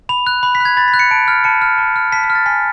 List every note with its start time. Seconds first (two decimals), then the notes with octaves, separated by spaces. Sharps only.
0.09 B5 F7
0.27 F#6
0.43 B5
0.55 B6
0.60 F#6 G#6
0.77 B5 A6
0.88 B6
0.94 F#6
0.99 C#7
1.11 A5 D7
1.28 F6
1.44 A5 C#7
1.62 F6
1.78 A5
1.96 F6
2.12 A5 B6
2.24 B6
2.30 F6
2.35 A6
2.46 G#5 B6